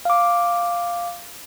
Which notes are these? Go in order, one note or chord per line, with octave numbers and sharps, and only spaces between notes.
F5 D6